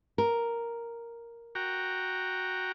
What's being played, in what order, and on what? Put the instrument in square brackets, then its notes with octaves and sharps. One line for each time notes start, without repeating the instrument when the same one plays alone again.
[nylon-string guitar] A#4
[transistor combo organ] F#4 G5 A#5